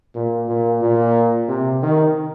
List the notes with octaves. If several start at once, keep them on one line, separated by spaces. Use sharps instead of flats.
A#2
A#2
A#2
C3
D#3